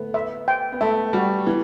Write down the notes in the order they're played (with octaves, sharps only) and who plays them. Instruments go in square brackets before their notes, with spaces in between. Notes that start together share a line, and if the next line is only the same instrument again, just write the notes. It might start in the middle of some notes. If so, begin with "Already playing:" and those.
Already playing: [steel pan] A3 [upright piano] B3
[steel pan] E5
G5
[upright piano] B3
[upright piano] A3 [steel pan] E5
[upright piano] G3 [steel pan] F#4
[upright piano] E3 [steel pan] B3